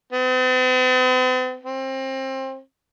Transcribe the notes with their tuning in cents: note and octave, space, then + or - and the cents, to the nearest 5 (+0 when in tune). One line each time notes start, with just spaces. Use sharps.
C4 -45
C4 +25